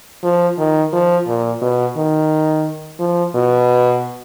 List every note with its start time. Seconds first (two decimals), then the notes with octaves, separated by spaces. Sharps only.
0.23 F3
0.58 D#3
0.93 F3
1.28 A#2
1.62 B2
1.96 D#3
3.00 F3
3.35 B2